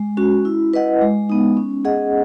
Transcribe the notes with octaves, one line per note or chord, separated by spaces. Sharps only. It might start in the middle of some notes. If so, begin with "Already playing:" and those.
Already playing: G#3
C#4 F#4
E4
B4 D#5 F#5
G#3
B3 D#4
C#4
G#4 D#5 F#5